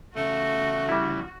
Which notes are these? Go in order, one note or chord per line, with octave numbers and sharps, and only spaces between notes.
E2 C#3 A3 F#4
G3 E4